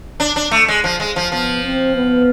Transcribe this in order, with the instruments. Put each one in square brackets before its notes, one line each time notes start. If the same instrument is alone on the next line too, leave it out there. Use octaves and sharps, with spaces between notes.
[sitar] D4
D4
A3
G#3
F3
G#3
F3
[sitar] F3 [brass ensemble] B3
[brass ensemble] C4
B3